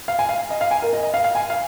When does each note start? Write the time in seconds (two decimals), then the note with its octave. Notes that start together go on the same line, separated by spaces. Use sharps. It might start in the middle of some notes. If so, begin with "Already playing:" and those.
0.08 F5
0.19 G#5
0.29 F5
0.50 D#5
0.61 F5
0.71 G#5
0.82 A#4
0.93 D#5
1.03 D#5
1.14 F5
1.24 F5
1.35 G#5
1.50 F5